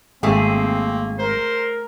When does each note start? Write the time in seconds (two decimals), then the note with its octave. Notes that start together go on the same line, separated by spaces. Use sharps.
0.23 G#1 A3 A#3 C4 G#4
1.19 A#4 C5